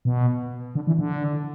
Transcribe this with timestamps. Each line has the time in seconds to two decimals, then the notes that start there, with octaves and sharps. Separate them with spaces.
0.05 B2
0.75 D3
0.87 E3
0.99 D3